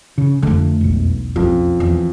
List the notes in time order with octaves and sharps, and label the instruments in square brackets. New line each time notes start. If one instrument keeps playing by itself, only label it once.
[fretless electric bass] C#3
[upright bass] F2 A3 [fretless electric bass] D3
[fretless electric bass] E1 B1
[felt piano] F2 [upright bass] C#4
[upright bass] E2